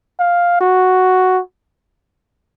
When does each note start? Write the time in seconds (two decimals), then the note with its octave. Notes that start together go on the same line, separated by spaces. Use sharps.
0.20 F5
0.61 F#4